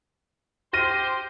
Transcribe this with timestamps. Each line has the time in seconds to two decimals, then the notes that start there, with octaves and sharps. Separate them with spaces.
0.73 G4 C5 F6 A#6 D#7